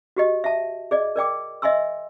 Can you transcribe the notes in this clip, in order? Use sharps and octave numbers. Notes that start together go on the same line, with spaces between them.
F#4 G4 D#5
E5 A5
G#4 D5 D#5
A#4 D5 G5 D6
D#5 E5 G#5 C6 E6